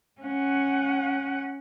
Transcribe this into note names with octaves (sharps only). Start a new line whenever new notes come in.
C#4 F#5